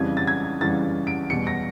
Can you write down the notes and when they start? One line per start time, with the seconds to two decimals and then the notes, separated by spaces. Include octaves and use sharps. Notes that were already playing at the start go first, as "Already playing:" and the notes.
Already playing: F2 C#3 E3 G3 G#6
0.17 A6
0.27 G#6
0.61 F2 C#3 E3 G3 A6
1.07 D7
1.30 E2 B2 G3 C#7
1.47 A#6